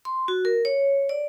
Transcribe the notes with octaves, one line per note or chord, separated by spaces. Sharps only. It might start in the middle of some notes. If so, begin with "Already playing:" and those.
C6
F#4
A#4
C#5
D5